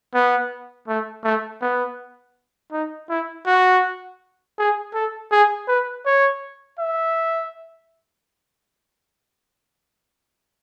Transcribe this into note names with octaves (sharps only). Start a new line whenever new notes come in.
B3
A3
A3
B3
D#4
E4
F#4
G#4
A4
G#4
B4
C#5
E5